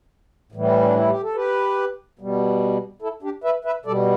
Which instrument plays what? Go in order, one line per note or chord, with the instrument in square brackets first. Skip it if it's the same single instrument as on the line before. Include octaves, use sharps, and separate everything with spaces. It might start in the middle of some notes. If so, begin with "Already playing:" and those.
[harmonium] A2 E3 G3
D4
E4
G4
A4
G4 B4
B2 G3
E4 A4
D4 G4
B4 E5
B4 E5
B2 G3 A4 D5